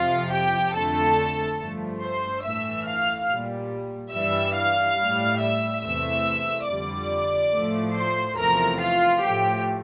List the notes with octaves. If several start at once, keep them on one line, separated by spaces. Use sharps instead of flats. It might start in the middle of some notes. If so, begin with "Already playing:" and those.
Already playing: F2 C3 F3 F4 F5
G4 G5
F2 D3 A3 A4 A5
G2 F3 A3
C5 C6
A2 E3 A3 E5 E6
F5 F6
A#2 G3
G2 E3 G3 E5 E6
F5 F6
A2 G3
E5 E6
E2 C3 E3 A3 E5 E6
F2 D3 G3 D5 D6
A2 F3 A3
C5 C6
E2 C3 F3 A3 A#4 A#5
F4 F5
A2 F3 A3 G4